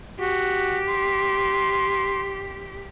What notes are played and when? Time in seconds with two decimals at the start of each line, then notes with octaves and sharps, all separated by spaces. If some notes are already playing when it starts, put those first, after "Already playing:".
0.20 F#4 G4
0.88 C6